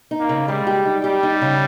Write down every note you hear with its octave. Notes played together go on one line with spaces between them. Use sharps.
D#4
A#3
C#3
G3 G#3
G4
D#4
G3 G4
D#4
C#3